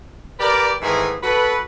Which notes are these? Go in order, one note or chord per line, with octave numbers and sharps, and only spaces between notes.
G4 A#4 B4 D5
G#2 D#3 E3 A3 G#4
F#4 A4 B4